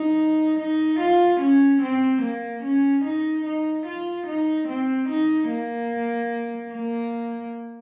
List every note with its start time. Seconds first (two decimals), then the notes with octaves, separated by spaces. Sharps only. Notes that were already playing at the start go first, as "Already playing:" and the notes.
Already playing: D#4
0.59 D#4
1.00 F4
1.41 C#4
1.82 C4
2.22 A#3
2.63 C#4
3.05 D#4
3.46 D#4
3.86 F4
4.27 D#4
4.68 C4
5.09 D#4
5.50 A#3
6.73 A#3